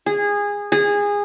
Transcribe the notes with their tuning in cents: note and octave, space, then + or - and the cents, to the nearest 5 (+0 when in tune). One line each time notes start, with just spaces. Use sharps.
G#4 -20
G#4 -20